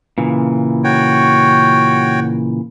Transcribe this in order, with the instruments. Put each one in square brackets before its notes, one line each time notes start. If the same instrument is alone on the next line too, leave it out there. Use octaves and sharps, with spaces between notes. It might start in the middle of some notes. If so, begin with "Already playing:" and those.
[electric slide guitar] A#2 C#3 E3
[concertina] F#4 C#5 G5